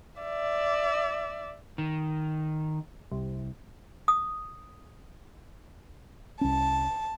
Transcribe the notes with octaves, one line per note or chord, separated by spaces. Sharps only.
D5 E5
D#3
C2
D#6
C2 C#4 A5